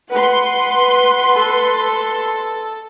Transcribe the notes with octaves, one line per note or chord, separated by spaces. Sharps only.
B4 F#5 C6
A4